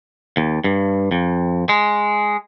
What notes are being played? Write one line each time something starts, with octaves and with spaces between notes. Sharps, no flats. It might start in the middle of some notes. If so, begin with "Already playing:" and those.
D#2
G2
F2
G#3